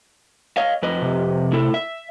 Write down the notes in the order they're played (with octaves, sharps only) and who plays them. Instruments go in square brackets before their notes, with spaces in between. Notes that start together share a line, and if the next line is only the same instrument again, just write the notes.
[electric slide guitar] C#5 D#5 F5
F2 B4 D#5
[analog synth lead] C3
[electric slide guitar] A2 E4 A4
E5